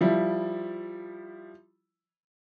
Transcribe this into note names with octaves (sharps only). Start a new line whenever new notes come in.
F3 G3 E4